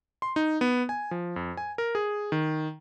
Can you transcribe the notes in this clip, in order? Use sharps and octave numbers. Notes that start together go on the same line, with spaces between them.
C6
D#4
B3
G#5
F3
F2
G#5
A#4
G#4
D#3